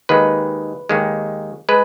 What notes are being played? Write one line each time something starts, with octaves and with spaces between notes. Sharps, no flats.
D#2 D#3 G#3 B4
D#2 D#3 G#3
G#3 B4